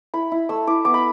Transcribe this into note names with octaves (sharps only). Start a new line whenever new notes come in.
E4 B5
E4
A3 E6
E4 D6
B3 D6
B5